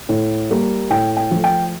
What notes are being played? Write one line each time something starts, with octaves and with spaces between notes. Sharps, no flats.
A2
G3 A#3
A2 G5
G5
F3 A3
G5